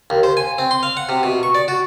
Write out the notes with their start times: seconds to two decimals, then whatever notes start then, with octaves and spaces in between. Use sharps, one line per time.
0.10 D#2
0.23 C5
0.37 G#5
0.58 C4
0.71 C6
0.83 F5
0.97 F#5
1.09 C3
1.23 B2
1.43 C#6
1.55 D5
1.68 F#4